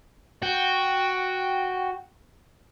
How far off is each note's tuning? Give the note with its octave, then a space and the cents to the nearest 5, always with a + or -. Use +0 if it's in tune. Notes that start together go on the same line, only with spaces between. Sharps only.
F#4 +0 G5 +0